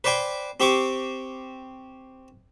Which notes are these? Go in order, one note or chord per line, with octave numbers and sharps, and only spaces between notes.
B4 C5 D5 G5 G#5
C4 G4 C5 C#6 D6